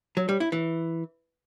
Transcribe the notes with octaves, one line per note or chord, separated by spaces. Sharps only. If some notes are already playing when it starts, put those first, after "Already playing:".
F#3
G3
E4
E3